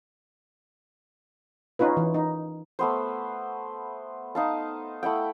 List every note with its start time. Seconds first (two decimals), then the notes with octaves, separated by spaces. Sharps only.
1.79 C#4 D#4 F4 B4
1.97 E3
2.14 D#4
2.79 A3 B3 C5
4.35 D#4 F5 A5
5.03 A3 E4 F#5 G5